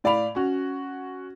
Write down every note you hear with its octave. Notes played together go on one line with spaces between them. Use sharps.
A2 D5 F5 B5 F7
C#4 F#4